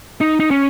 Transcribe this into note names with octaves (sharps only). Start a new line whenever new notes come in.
D#4
D#4
C#4